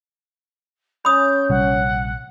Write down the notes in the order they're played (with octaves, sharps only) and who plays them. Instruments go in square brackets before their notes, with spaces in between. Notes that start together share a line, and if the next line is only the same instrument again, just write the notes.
[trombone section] C#4 [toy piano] B5 D#6 [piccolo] G6
[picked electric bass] A#1 C3 G3 [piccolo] F#5